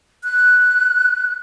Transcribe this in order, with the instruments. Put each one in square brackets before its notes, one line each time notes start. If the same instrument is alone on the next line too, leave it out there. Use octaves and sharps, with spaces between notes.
[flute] F#6